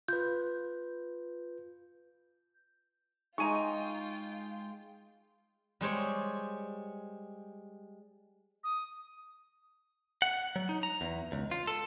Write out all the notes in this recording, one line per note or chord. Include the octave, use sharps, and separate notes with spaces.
F4 B4 G6
G#3 D#4 F4 G5 G#5 A#5 C#6 D#7
G3 G#3 C5 C#5
D#6
F#5
F#3
D#4
A#5
E2
C#2
F4
A4